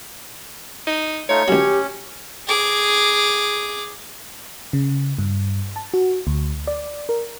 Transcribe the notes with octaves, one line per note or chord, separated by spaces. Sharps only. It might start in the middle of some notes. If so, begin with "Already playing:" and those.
D#4
A3 D#4 F4 C#5
C#2 F#3 C#4 G4
G#4 D6
C#3
G2
A5
F#4
D2
D5
A#4